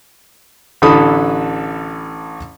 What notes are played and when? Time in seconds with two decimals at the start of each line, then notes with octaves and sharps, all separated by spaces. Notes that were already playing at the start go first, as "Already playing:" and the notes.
0.82 A1 D3 E3 A4 B5 D#6